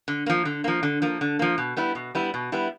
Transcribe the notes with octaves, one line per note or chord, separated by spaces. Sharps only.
D3
F3 A#3
D3
F3 A#3
D3
F3 A#3
D3
F3 A#3
B2
G3 B3 E4
B2
G3 B3 E4
B2
G3 B3 E4